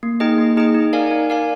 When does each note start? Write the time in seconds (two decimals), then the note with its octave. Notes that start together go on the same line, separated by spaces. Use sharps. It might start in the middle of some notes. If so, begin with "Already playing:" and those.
0.03 A#3
0.20 D#4 G#4 D#5 G5
0.38 A#3
0.57 D#4 G#4 D#5 G5
0.75 D#4
0.93 A#4 D5 F5 G#5
1.11 D#4
1.30 A#4 D5 F5 G#5